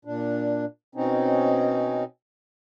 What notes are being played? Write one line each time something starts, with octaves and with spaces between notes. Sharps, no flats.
A#2 D4
B2 C4 C#4 D#4